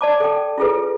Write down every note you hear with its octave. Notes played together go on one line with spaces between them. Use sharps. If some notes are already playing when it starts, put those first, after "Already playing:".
D5 A5 D6
A4 G5
E4 F4 G#4 A4 B4